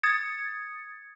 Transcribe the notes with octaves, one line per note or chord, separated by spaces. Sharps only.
D#6 G#6 A6 C#7